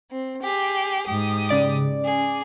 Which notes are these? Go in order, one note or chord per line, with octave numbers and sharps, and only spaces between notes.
C4
G4 G#4
G#2 G4 D#6
C#3 D5 D6
G#4